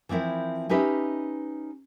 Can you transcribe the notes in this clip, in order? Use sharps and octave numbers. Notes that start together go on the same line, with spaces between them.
E3 F3 C4 E4 A#4
C#4 D#4 G4 B4 D#5 E5